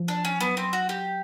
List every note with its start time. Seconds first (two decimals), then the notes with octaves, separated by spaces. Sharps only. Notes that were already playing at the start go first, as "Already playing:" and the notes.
Already playing: F3
0.08 D4
0.25 C#4
0.40 F#3 B3
0.57 C4
0.73 F#4
0.89 G4